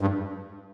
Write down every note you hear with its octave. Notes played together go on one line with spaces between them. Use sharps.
G2